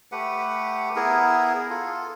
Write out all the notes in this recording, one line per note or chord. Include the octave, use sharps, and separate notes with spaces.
A3 G4 B4 F#5
B3 E4 G#4 A#4
F4 A4